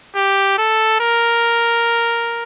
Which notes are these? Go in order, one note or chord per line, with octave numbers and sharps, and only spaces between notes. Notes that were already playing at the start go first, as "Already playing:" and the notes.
G4
A4
A#4